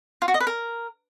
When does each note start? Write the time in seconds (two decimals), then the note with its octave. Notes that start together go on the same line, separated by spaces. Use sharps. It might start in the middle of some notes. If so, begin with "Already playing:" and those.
0.22 F4
0.28 F#4
0.34 D#5
0.40 B4
0.47 A#4